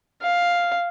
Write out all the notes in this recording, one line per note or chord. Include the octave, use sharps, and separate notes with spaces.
F5